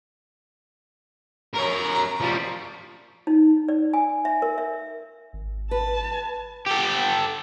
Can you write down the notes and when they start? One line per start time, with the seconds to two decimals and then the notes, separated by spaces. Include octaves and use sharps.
1.54 A#4 C#5 A#5
2.21 F3 G3
3.27 D#4
3.69 D5
3.94 G#5
4.25 E5
4.42 A#4
4.58 E5
5.33 G#1
5.71 B4 A5
6.67 G4 A4